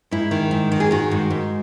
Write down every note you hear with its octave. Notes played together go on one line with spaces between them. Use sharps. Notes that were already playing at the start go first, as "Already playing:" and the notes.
G#2 E4
D#3
G#2
D#3
G#4
D#3 F#4
G#2
G#2